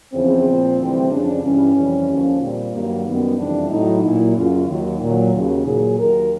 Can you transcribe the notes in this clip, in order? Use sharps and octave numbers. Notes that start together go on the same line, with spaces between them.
E2 C#3 F3 C4
A#2 F3
D2 C3 E3 G3
F2 C#3 F3 D4
G2 E3 G3 C#4
F2 C3 E3 G3
D#2 D3 F3
A#2 G3 C4
G2 D#3 F#3 A#3
F#2 D#3 G3 B3
F2 C3 E3 G3 D4
A2 F#3 D#4
A#2 F#3 E4
F#2 C#3 F#3 F4
D#2 D#3 F#3
A#2 F#3
D#2 C#3 F#3
A#2 F#3 G#4
D#2 D#3 F#3 A#4